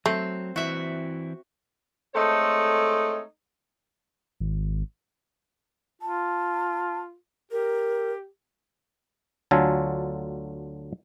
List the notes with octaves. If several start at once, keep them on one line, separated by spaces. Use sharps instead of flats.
F#3 A3 C4
E3 C4 E4 F#4 E5
G#3 A3 C4 D#4 A4 C#5
G#1
F4 A5
G4 A#4
D2 D3 F#3 F4 A4 G#5